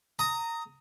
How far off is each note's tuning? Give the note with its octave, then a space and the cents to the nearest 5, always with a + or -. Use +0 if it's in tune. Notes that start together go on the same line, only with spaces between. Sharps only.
A#5 -15 D#6 +15